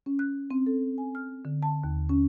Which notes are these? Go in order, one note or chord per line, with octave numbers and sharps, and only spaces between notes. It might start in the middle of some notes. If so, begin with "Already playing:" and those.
C#4
F#6
C4
A4
G#5
F6
D3
A5
D#2
C#4